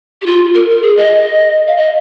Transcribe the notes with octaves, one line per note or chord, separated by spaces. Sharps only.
G4
F4
A#4
A#4
G#4
D#5
F5
D#5